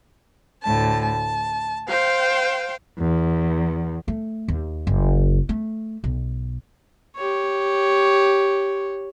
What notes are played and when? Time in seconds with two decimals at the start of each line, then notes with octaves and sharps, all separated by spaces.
0.64 D2 A2 A5
1.03 A5
1.89 C5 F5 G5
2.99 E2
4.08 A3
4.48 D#2
4.87 F#1
5.49 A3
6.04 B1
7.17 G4 C#5